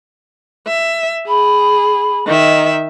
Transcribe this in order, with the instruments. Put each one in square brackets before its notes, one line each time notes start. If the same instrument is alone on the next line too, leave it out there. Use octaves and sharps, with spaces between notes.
[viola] E5
[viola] G#4 [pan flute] B5
[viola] D#3 E5 [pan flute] D#5